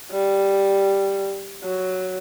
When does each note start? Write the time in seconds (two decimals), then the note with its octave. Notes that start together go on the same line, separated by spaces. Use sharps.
0.12 G3
1.64 F#3